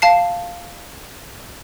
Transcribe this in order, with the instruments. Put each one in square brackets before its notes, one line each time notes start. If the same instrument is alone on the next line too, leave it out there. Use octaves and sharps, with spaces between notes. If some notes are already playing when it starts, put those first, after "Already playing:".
[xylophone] F5 A5 C7